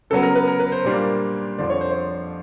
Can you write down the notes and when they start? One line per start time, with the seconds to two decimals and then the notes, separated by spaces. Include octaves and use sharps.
0.10 C#3 F#3 B3 A4
0.23 A#4
0.35 B4
0.48 A#4
0.60 B4
0.72 C5
0.85 A#2 G3 A#3 D4
1.58 F2 D3 F3 D5
1.70 C#5
1.81 C5
1.91 C#5